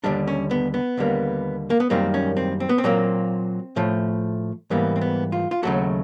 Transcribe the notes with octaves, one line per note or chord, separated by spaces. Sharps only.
D#2 D3 G3 D4
C#4
B3
B3
D#2 D3 G3 A#3
A#3
B3
F#2 D#3 G3 A#3 C4
C#4
C4
C4
B3
C4
A#2 F#3 A#3
A2 F3 A3
G#2 E3 G3 A#3 B3
C4
B3
F4
F4
D#2 C#3 F#3 A3 F#4